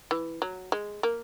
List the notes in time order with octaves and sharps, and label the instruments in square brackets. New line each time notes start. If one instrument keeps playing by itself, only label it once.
[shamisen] E3
F#3
G#3
A#3